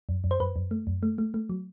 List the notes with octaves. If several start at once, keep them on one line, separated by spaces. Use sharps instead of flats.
F#2
F#2
C5
F#2 B4
F#2
A3
F#2
A3
A3
A3
F#3